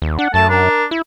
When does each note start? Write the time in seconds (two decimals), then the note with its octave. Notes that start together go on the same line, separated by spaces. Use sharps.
0.02 D#2
0.19 D4 F#5
0.34 F#2 A3 A5
0.49 D4 A#4
0.91 E4